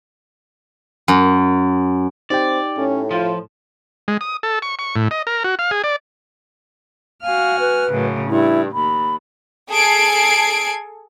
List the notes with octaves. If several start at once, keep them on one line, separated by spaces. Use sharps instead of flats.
F#2
C4 D#4 G4 D5 G5
A2 C#4
F3 F4
G#3
D#6
A4
C#6
C#6
A2
D#5
A#4
F#4
F5
G#4
D5
F#4 F5 G#5 F6
B4
F#2 A2 C#3
G2 E4
D#2 B5
G#4 A4 G#6 C7 D7